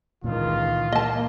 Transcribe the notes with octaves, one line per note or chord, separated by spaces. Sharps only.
C#2 A#2 D#3 E3 F4
A#3 D#5 A5